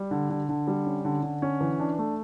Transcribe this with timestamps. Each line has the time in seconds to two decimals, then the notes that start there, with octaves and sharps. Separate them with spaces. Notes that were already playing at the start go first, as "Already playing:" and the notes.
Already playing: G3
0.11 D3
0.30 D3
0.49 D3
0.68 G3
0.86 C#4
1.05 D3
1.23 D3
1.42 C#4
1.61 E3
1.80 D4
1.99 A3